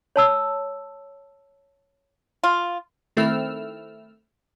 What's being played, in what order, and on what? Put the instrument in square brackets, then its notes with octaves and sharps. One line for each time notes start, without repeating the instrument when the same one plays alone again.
[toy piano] C#5 A5 E6
[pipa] F4
[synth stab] D#3 A3 C4 E4 E6 F6